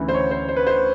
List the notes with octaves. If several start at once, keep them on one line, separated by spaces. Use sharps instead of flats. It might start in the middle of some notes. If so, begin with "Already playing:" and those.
Already playing: D2 C#3 E3
C5
C#5
C5
C5
B4
C5